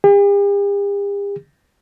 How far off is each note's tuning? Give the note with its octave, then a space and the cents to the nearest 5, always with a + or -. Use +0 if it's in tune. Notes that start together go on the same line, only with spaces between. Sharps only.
G4 +45